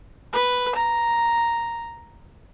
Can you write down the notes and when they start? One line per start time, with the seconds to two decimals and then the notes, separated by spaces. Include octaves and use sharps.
0.33 B4
0.75 A#5